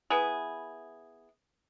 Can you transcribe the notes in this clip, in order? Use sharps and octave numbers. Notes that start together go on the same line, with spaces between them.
B3 E4 G#4